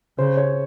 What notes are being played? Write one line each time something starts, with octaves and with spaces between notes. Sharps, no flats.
C#3 C5
C#5